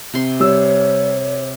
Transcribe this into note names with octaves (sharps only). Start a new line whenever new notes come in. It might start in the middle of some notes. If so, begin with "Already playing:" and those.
C3 C6
G3 C#5 E6